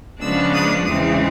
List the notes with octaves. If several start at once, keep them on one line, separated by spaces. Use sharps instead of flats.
C#3 F3 G#3 B3 D4 E6
D#6
E2 C#3 E3 G#3 C4 D#6